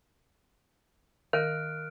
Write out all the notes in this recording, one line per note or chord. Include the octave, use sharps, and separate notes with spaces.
D#3 A#4 F5 F6 F#6 D7